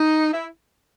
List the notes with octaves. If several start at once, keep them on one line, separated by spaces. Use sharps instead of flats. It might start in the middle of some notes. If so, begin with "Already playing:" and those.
Already playing: D#4
E4